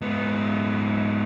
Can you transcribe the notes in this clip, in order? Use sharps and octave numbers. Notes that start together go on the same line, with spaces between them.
G#2 B3